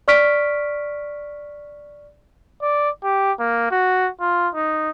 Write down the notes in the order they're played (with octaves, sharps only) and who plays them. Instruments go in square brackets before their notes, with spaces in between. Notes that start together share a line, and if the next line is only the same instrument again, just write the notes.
[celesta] D5 C#6 F6 B6 D7
[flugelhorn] D5
G4
A#3
F#4
F4
D#4